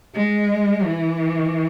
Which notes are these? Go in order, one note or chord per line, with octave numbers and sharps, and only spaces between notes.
G#3
E3